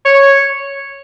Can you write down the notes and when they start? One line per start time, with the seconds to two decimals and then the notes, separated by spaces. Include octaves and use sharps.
0.05 C#5